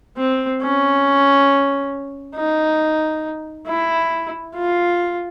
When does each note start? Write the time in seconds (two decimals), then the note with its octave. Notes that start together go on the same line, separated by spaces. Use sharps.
0.18 C4
0.62 C#4
2.36 D#4
3.67 E4
4.55 F4